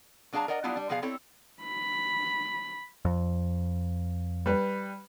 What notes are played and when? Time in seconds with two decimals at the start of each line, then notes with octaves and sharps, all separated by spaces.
0.32 F#3 D4 G#4 F5 A5 A#5
0.48 A#4 D5 D#5 F#5 G5 A#5
0.64 F#3 G3 B3 D4 E4 F4
0.76 G3 D4
0.89 B2 F3 B3 G#4 A#4 F5
1.02 C4 E4 A4 C#5
1.63 B5
3.05 F2
4.46 G3 B4